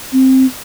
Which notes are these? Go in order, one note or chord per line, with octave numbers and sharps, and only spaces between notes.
C4